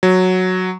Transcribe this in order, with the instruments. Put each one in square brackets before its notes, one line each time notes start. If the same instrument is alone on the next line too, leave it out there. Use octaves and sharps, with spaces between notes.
[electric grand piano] F#3